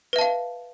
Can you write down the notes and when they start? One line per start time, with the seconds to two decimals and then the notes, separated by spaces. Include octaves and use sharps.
0.13 B4
0.16 E5
0.19 A5
0.21 F5